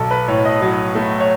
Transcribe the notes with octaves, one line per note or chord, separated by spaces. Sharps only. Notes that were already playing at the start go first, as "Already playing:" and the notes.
Already playing: B1 A4
B4
A2 C#5
D#5
F#3
A3
C#5